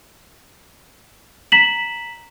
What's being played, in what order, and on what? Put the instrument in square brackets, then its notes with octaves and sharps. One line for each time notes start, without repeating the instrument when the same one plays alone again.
[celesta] A#5 B6 E7 F#7